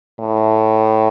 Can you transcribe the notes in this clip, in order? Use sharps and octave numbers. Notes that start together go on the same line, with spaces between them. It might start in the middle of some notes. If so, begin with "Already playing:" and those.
A2